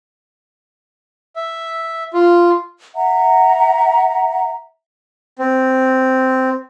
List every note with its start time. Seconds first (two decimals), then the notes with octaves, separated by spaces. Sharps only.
1.36 E5
2.13 F4
2.96 E5 F#5 A#5
5.39 C4